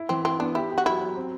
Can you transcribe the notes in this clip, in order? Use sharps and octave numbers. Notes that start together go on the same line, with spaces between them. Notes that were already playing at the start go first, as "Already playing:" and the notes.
Already playing: E4
E3 C4
C4 E4
B3 D4
E4 G4
G4
F#4
F#3 E4
F#3
C4